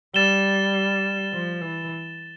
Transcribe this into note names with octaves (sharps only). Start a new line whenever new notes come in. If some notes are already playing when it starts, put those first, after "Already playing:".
G3 A6 E7 G7
F3
E3